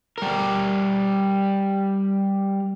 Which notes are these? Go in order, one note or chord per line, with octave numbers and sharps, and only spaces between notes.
G3 A#4